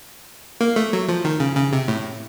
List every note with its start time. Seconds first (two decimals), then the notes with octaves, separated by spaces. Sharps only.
0.61 A#3
0.76 A3
0.93 F#3
1.09 F3
1.25 D#3
1.40 C#3
1.56 C#3
1.73 C3
1.88 A2